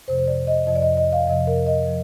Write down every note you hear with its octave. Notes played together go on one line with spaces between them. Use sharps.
F2 C3 F3 C5
C5
D5
D#5
F2 C3 F3 D#5
D5
D#5
D#5
F5
F2 C3 F3 D#5
A#4
D#5
F3